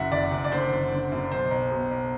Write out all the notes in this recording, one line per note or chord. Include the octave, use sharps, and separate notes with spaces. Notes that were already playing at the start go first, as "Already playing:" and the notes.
Already playing: F#1 F#2 E5 F#5
F#1 D5
F#1
D5
D3 C5
F#1
D3
F#2
B1 C5
B1
B2
B1